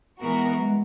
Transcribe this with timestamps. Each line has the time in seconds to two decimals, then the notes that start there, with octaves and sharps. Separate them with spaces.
0.21 E3 G#3 B3 F#4 A#4
0.57 F#3
0.62 G#3